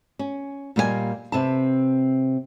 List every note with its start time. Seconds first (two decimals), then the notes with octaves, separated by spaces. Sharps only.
0.19 C#4
0.76 A#2 G3 A#3 D#4 C#5 G#5
1.32 C3 C4 B4 A5